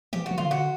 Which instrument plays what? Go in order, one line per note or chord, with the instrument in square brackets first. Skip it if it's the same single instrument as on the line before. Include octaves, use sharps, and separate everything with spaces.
[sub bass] E3 [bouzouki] G4
[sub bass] D#3 [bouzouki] F#4
[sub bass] D3 [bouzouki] F4
[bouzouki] F#4